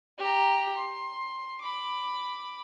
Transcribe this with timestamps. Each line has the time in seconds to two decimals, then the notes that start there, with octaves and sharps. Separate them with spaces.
0.19 G4 A#5
0.76 C6
1.62 B5 D6